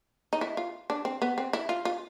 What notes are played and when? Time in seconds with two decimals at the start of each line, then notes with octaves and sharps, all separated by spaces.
0.33 D#4
0.41 E4
0.57 F4
0.90 D4
1.05 C4
1.22 B3
1.38 C4
1.53 E4
1.69 F4
1.85 F4